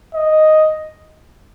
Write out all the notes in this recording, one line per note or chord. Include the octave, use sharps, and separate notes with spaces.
D#5